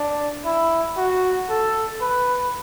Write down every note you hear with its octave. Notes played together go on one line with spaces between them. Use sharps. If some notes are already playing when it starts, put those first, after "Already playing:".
Already playing: D4
E4
F#4
A4
B4